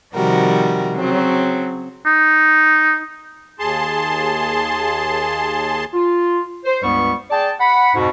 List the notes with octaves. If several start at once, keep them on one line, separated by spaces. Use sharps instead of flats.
C3 D#3 F3 G3 F#4 A#4
C#3 F#3 C4
D#4
D#2 G#4 A5 C6
F4
C5
C#2 G2 G3 B3 C#6
G#4 D5 G5 A5
F#5 B5
F2 G#2 B2